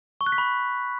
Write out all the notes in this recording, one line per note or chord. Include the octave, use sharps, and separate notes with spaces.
C#6
F#6
B6
B5